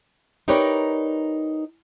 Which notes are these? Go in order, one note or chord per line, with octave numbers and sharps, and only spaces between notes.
D#4 G4 A#4 B4 C#5 D5